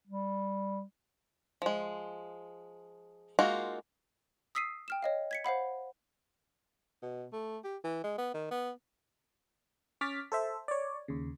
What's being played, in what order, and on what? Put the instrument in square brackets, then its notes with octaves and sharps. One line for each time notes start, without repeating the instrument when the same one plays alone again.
[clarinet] G3
[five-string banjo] F3 G#3
G#3 A#3 D#4 F4 F#4
[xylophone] D#6 E6 B6 C7 D#7
G5 F6 E7
C#5 D#5 F5
G#6 B6 C#7
C5 F5 F#5 B5
[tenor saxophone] B2
A3
G4
E3
G#3
B3
D#3
B3
[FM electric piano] C#4 C#5 D6 F6 A6 B6
A4 C5 E5
C#5 D5
D#2 C#3